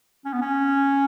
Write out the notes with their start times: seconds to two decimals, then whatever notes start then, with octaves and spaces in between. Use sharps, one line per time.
0.25 C#4
0.33 B3
0.41 C#4